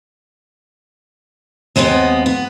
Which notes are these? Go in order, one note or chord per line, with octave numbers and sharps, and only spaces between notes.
D#2 G#3 B3 C4 D#4
B3